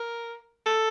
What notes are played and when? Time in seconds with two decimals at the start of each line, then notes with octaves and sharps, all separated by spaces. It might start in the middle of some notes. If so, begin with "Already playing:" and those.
Already playing: A#4
0.66 A4